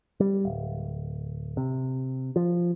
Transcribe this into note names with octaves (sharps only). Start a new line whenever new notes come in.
G3
D1
C3
F3